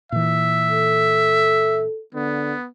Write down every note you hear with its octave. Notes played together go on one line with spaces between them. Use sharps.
A#2 E3 E5
A4
D3 B3